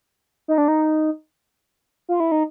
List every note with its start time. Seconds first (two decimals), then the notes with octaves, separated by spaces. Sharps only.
0.48 D#4
0.58 D4
0.68 D#4
2.09 F4
2.20 E4
2.32 D#4